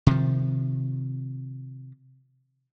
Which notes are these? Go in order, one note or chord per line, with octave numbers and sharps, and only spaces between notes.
C3 D#3 F3